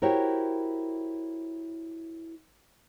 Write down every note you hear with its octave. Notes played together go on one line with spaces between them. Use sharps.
E4 F#4 G4 A#4 C5 C#5